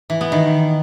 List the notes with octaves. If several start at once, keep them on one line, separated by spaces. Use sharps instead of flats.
E3
B3
D#3